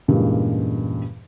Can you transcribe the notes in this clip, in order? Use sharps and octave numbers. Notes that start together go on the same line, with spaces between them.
E2 G2 A#2 C#3 G#3 A#3